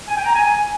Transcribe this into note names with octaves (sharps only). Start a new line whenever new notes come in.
G#5
G5
A#5
G#5